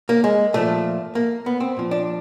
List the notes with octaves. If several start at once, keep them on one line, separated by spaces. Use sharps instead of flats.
A#3
G#3
A#2 F3 A3
A#3
B3
C4
A#2 F3
D4